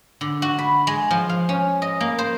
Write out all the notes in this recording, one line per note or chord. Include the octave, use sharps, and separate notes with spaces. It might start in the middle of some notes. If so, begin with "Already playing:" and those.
D3
F#4
B5
G#3
F3
F5
C#4
D#5
A#3
C5